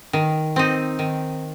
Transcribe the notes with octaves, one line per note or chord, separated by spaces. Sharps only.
D#3
C4 D#4
D#3